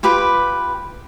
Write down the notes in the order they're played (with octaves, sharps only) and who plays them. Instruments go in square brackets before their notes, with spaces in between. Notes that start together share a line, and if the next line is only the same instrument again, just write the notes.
[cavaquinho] F4 G4 B4 B5